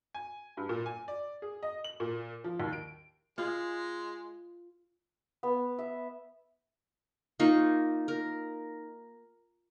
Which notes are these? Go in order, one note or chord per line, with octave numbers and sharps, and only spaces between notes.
G#5
G2
A#2
G#5
D5
G#4
D#5
F#7
A#2
F3
D#2
D7
G#3 F4
B3
E5
A#3 D#4 F4 C#6
A#4